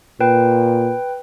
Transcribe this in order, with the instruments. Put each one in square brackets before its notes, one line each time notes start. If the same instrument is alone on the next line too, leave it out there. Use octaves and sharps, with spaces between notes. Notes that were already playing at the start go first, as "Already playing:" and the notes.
[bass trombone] A#2 [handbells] B4 G5